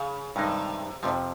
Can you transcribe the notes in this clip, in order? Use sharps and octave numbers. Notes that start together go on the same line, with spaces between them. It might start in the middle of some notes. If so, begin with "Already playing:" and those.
Already playing: C#3
G2 C3 D#3 G#3 D#4
F2 G#2 C3 F3